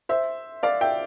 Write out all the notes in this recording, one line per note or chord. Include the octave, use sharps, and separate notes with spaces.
C5 E5
D5 F5
E5 G5